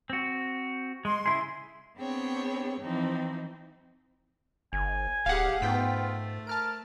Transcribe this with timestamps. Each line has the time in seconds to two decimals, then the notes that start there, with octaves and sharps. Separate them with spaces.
0.10 C4 F#4
1.05 G#3 C6
1.26 C#3 E4 G#4
1.98 B3 C4 D4 G#4 C#5 G5
2.80 E3 F3 C4 D#4
4.73 G1 G#5
5.26 D1 G4 G#4 F5 F#5
5.62 G#2 A3 B3 F4 G5 B6
6.47 A#4 A5 F6 D7